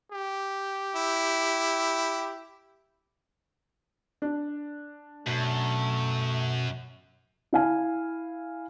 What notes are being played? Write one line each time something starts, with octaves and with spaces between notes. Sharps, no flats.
G4
E4
D4
F#2 B2 A3
E4 F5 G#5